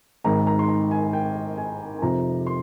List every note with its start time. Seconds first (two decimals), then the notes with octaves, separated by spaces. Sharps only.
0.24 G#1 G#2 D#3 A#5
0.47 A#5
0.59 C6
0.69 A#5
0.91 G#5
1.13 G5
1.58 G#5
1.98 G#5
2.02 F2 C3 F3 A#5
2.47 C6